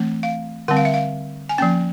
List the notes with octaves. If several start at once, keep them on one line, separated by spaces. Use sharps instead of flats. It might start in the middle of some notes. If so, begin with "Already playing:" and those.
Already playing: E3 A3 C4
F5
D3 G3 C4 F#5
F5
E5
F5
G#5
F3 A#3 C#4 G5